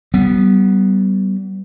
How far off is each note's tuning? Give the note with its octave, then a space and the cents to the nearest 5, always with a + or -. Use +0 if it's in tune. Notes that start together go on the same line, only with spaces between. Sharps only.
G3 -30 B3 +0